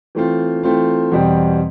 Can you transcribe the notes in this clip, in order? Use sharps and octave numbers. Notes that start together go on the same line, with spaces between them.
E3 A3 C4 F4
E3 A3 C4 F4
E2 B2 G3 C4